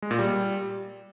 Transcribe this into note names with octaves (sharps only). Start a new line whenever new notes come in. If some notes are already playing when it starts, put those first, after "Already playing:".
G#3
A#2
G3